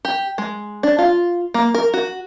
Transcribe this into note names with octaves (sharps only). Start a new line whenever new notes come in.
G4
G#3
D4
F4
A#3
A#4
F#4